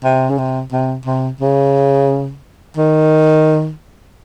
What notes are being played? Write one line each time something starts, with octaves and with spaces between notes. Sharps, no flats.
C3
C#3
C3
C3
C3
C#3
D#3